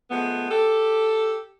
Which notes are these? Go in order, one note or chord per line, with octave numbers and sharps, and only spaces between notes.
F3 G#3 A3 B3
G4 A4